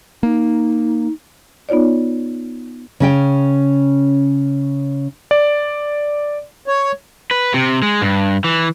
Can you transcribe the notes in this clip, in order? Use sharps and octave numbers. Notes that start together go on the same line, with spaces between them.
A#3 D#4
B3 D#4 F4 C#5 D5
C#3 C#4 G5
D5
C#5
B4
C3
G#3
G2
E3